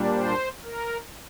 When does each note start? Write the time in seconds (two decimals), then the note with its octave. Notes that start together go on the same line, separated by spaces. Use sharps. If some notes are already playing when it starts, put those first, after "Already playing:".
Already playing: A#2 G3 D4
0.15 C5
0.63 A#4